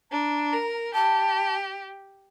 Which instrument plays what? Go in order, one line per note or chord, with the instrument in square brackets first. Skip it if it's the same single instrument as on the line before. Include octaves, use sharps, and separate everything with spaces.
[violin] D4 [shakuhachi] A#5
[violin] A#4
[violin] G4 [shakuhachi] A5